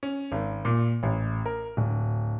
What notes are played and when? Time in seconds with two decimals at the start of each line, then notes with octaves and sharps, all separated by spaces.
0.03 C#4
0.32 G#1
0.65 A#2
1.03 A1
1.46 A#4
1.77 D1